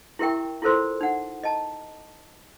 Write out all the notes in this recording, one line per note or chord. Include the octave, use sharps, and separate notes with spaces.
E4 G4 A#4 E5 G5 C#6
E4 F4 A4 A#4 C5 C6
D#4 F#5
D#5 A5 A#5